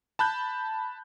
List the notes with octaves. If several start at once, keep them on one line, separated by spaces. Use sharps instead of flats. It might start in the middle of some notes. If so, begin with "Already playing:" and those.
A5 B5 F#6 G6